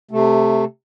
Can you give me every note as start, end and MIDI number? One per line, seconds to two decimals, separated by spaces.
0.11 0.64 48
0.11 0.64 57